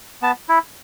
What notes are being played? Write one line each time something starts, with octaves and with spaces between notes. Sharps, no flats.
B3 A5
E4